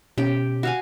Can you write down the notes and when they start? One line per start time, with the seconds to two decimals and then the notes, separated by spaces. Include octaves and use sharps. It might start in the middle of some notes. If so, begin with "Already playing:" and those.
0.18 B2 C#4 G4 G5
0.63 F#4 F5 G#5